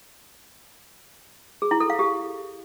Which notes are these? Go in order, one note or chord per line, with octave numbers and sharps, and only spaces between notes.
G#4
E4
A4
F5
G4